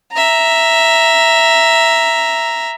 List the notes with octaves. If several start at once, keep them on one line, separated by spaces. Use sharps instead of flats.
E5 A#5